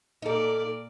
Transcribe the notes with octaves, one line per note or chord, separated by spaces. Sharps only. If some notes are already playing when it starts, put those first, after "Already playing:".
A#2 D#4 A4 A#4 D5